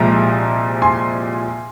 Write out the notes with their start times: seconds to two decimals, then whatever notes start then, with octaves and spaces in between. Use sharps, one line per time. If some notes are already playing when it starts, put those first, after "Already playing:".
Already playing: C2 A#2 F3 G#3 A#5
0.82 G#5 C6